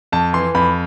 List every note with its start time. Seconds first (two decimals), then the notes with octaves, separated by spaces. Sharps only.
0.12 F2 A5
0.33 E3 C6
0.55 F2 B5